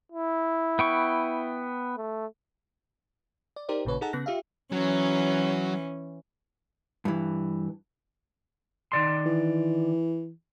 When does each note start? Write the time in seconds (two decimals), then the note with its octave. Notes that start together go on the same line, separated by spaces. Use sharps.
0.12 E4
0.79 B3 G5 C#6
1.97 A3
3.56 D5
3.69 D#4 G4 A#4 C5 D5
3.85 A1 A#2 C#3 B4 C#5
4.01 D#4 G#4 A4 F#5 A5 A#5
4.13 C#3 B3 F#6 A#6
4.26 F4 G4 E5 F5
4.72 E3 F#3 C#4
7.05 G2 E3
8.92 D#3 D5 C6
9.26 E3